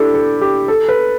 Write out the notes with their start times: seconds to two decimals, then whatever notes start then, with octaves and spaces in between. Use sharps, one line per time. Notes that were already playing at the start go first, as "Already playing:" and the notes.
Already playing: D4 E4 G4 A4
0.14 A4
0.41 G4
0.68 A4
0.89 B4